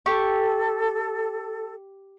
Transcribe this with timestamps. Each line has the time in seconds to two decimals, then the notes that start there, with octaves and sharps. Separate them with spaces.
0.06 G4 A4 C#6